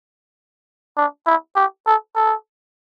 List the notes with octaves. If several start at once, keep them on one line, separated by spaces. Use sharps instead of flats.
D4
E4
G4
A4
A4